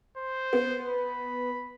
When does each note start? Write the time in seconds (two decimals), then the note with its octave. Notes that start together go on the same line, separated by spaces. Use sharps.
0.17 C5
0.53 B3
0.87 B5